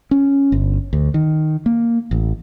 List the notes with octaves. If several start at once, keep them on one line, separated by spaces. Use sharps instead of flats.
C#4
G1
D2
D#3
A#3
A1